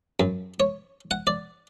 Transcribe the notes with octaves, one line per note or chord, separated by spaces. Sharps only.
F#2
C#5
F#5
D5